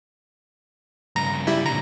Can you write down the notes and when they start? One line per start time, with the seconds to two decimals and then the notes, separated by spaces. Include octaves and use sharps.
1.16 G2 C#3 A#5
1.47 G3 E4
1.65 A#2 D3 A#5